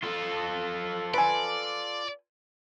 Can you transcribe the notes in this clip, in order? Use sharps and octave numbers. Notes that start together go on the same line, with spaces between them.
F4 A4
B4 D5 G#5